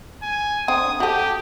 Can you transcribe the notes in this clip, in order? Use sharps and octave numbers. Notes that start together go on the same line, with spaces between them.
G#5
D3 C4 D#6
F#4 G4 A4